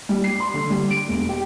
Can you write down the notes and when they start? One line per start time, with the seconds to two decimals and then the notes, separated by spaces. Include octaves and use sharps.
0.09 G3
0.24 C7
0.40 C6
0.54 D3
0.70 G3
0.90 D7
1.08 E1
1.29 G4